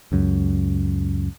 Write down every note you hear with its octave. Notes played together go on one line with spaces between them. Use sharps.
C#2 F#2